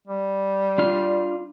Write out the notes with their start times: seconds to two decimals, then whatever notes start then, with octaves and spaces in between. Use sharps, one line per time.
0.07 G3
0.78 D4 F4 F6